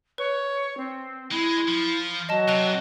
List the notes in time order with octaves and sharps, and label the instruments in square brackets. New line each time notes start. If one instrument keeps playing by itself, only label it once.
[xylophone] B4 [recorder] C#5
[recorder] C4
[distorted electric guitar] G#3 [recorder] E4
[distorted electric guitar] F3
[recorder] F#3 [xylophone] D#5 A5
[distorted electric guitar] C3 [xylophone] A5 F#6 F7